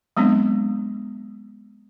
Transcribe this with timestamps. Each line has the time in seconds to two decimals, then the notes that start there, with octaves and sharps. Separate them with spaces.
0.17 F#3 G#3 B3 C4 D4